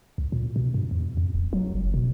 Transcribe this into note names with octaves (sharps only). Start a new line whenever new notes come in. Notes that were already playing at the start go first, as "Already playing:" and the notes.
C#2
A#2
B2
G2
E2
F2
D1
F#3
F#1
B2